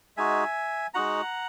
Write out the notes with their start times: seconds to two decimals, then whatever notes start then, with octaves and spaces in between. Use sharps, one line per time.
0.17 G#3 D#4 F#4 E5 G#5
0.94 G#3 D#4 F#4 F#5 A#5